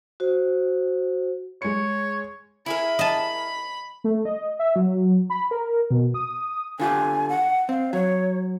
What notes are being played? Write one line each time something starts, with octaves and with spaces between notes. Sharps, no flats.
F#4 C5
G#3 C#5 C#7
E4 G#4 A#4 B5
D#5 A5
A3
D#5
E5
F#3
B5
A#4
B2
D#6
D3 F4 G4 G#5
F#5
C4 F5
F#3 C#5